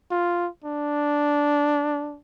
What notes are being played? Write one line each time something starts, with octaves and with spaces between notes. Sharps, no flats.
F4
D4